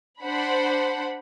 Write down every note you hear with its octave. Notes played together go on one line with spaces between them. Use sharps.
D4 C5 F#5 B5